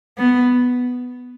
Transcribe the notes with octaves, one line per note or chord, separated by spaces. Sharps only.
B3